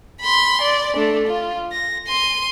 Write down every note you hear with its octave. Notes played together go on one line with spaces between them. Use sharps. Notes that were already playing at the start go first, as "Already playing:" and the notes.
B5 C6
D5
A3 D4
F4
A#6
C6 D#7